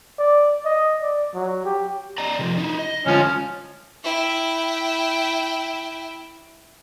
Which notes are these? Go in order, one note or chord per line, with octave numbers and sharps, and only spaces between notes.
D5
D#5
D5
F#3
G4
D5 D#5 A#5
C3 F3
D#4 E4
D#5
D3 E3 F3 G#3 C#4
E4 G5